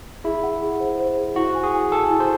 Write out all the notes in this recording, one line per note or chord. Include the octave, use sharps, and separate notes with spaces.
E4 G#4
F#5
G#4
C5
C5
G#4
E4 F#4
G#5
G#4
G#5
A4 G#5
E4
C5